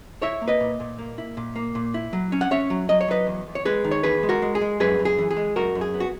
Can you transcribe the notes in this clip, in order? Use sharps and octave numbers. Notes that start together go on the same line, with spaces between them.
E4 C#5 E5
A#3
B4 D#5
A#2
A#2
A#3
E4
A#2
A#3
A#2
E4
F#3
C#4
F#5
C#4 C#5 E5
F#3
F#3 D#5
C#5
F#3 B4 D#5
E2
E2
C#5
G#3 G#4 B4
D#3
C#5
E2 G#4 B4
G#3
F#4 A#4
G#3
G#4
G#3
F#2 G#4 B4
F#2
G#4
E3
G#4
G#3
F#2 F#4 A#4
F#2
G#4
B3
F#4